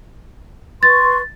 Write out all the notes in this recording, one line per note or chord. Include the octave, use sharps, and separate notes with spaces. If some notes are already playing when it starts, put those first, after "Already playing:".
B4 C6 C#6 A6